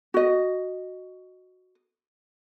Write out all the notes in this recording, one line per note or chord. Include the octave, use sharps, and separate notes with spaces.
F#4 D#5